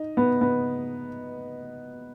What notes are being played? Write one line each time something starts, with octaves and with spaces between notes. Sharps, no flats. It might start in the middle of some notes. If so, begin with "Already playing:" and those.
Already playing: D#4
B3
B3